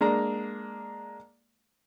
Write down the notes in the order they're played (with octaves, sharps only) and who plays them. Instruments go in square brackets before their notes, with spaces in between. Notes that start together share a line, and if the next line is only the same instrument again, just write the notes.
[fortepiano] G#3 A#3 D4 A#5